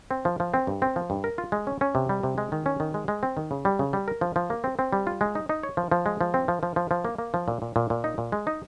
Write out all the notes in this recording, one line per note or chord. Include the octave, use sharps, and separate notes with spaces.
C4
F3
F3
C4
G2
C4
F3
G2
A#4
F4
G#3
C#4
C#4
C3
G3
C3
G#3
D#3
C#4
D#3
G#3
G#3
C4
D#3
C#3
G3
C#3
G3
A#4
F3
F3
A#3
C4
C4
G3
F4
G#3
D#4
D#4
C#5
F3
F3
G#3
F3
C4
F3
F3
F3
F3
A#3
A#3
F3
A#2
A#2
A#2
A#2
D#4
A#2
G#3
D#4